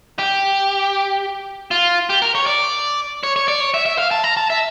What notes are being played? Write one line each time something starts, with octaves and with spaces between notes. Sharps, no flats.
G4
F4
G4
A#4
C#5
D5
C#5
C#5
D5
C#5
E5
E5
F5
A5
A#5
A5
E5